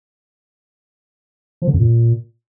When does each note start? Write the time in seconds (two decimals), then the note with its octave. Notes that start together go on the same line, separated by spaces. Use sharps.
1.62 F3
1.68 D3
1.73 F2
1.79 A#2